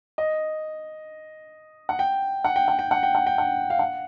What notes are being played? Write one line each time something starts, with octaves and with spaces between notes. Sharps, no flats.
D#5
F#5
G5
F#5
G5
F#5
G5
F#5
G5
F#5
G5
F#5
F5
F#5